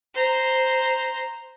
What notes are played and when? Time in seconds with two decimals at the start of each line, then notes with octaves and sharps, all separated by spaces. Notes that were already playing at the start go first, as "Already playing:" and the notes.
0.14 C5 A#5